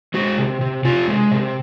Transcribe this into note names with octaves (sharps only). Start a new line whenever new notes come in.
G#3 F#4
C3
C3
C3 F4
G#3
C3